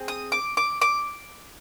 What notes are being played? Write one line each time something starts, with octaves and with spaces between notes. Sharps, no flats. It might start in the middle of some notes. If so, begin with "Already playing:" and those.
Already playing: C4 G#4
D#6
D6
D6
D6